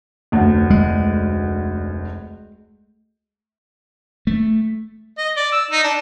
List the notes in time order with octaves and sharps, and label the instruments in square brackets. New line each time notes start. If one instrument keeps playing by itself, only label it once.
[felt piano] F1 D2
[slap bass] G#3
A3
[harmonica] D#5
D5
E6
D#4
D4